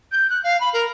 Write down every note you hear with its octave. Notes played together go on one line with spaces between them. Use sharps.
G6
F#6
F5
B5
A#4